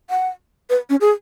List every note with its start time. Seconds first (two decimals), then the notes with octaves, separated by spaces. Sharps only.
0.10 F#5
0.70 B4
0.90 C#4
1.01 G#4